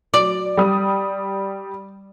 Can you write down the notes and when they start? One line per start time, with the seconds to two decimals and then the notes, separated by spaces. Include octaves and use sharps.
0.14 F#3 D5 D6
0.57 G3 D#6